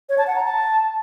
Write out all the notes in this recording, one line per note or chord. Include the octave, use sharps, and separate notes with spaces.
C#5
A5
F#5
A#5
A5